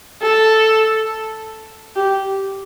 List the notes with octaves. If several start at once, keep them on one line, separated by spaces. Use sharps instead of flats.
A4
G4